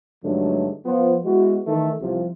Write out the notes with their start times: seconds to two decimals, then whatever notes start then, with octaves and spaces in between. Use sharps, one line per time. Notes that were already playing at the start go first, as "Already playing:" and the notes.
0.24 G2 D3 F#3 G#3 A3 D#4
0.85 F3 B3 C5
1.25 G#3 B3 E4 F#4
1.67 D#3 E3 A3
2.02 C2 C3 F3